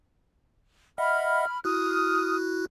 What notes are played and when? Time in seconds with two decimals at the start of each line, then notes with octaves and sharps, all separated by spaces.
0.98 D#5 E5 F#5 B5 F6
1.64 E4 F#4 D#6 F6 F#6